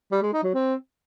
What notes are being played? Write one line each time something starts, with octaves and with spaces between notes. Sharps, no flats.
G3
G#3
D#4
F#3
C4